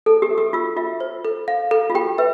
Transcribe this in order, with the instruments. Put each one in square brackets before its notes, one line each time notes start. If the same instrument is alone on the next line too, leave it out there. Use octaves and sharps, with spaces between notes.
[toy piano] A4 [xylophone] A5
[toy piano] G4
[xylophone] E5
[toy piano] G4
[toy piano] F4 [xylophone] E6
[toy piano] F4 [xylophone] E5
[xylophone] C5
A4
F5
A4
[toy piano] F4
[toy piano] G4 [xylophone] G5
[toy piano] B4 [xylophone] E5